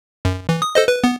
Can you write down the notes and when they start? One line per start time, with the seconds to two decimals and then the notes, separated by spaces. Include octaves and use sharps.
0.25 F#2
0.49 E3
0.62 D#6
0.75 A4 C5 D#5
0.88 B4
1.04 B3